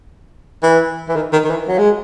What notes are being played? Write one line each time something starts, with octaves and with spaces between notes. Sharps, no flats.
E3
E3
D#3
D#3
D#3
E3
F#3
G#3